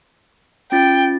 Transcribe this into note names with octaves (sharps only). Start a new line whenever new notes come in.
C#4 F4 G5 A6